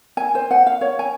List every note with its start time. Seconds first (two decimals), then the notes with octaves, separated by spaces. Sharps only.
0.17 G#5
0.35 C5
0.51 F#5
0.67 F5
0.81 C#5
0.99 G#5